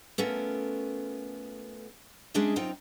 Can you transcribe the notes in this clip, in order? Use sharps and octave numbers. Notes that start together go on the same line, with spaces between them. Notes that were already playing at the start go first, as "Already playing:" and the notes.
A3 B3 C#4 F4 A4 A#4
G#3 C#4 D4 G#4 D#5 E5
F#2 C4 D#4 F4 G5